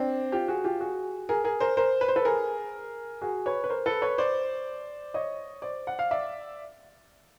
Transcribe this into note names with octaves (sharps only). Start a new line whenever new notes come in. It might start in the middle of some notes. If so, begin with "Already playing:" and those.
Already playing: C4 D4
F4 G4
F#4 G#4
F4 G4
F#4 G#4
G#4 A#4
G#4 A#4
A#4 C5
A#4 C5
B4
C5
A4 B4
G#4 A#4
F#4 G#4
B4 C#5
B4
A#4 C5
A4 B4
B4 C#5
C5 D5
C#5 D#5
C5 D5
F#5
F5
D5 E5